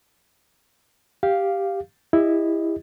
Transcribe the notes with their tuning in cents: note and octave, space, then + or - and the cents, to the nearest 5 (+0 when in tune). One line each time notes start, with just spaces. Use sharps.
G4 +0 F5 +0
E4 +0 G4 +35 D#5 +0